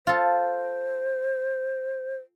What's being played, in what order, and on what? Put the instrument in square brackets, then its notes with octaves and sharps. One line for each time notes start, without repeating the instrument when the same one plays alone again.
[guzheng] F4 A4 [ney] C5